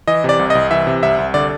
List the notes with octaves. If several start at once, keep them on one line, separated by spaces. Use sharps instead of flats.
E3 D#5
C3 D5
C2
C2 D#5
E3 E5
C3
C2 E5
C2
D3 D5